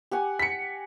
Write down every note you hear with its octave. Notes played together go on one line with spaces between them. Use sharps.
G4 F#5 G#5
B6 C#7